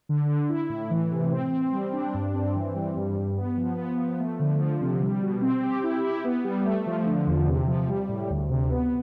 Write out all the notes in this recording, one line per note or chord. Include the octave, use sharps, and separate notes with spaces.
D3
D3
E4
A2
E3
C3
C4
C4
G3
D4
G2
C4
E3
G3
G2
G2
B3
F3
B3
F3
A3
D3
F3
C3
G3
B2
C4
G4
E4
E4
B3
G3
A3
F3
D3
E2
C3
F3
G3
A2
D2
C3
B3